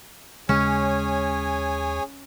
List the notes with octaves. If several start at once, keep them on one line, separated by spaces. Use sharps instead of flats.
D#2 C#3 G#3 C#4 G#4 C#5 G#5